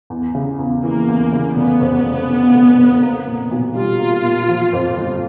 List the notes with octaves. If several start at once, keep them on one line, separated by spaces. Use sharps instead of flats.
E2
C#3
E2
E3 A#3
E2
C#3
F1 B3
F2
F1
D3
F1
F2
A#3
A#2
B1
G3 F4
A#3
A#2
F3
F2
G1